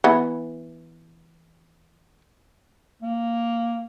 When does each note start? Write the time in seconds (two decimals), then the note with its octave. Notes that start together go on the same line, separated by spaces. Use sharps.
0.04 E3 B3
3.02 A#3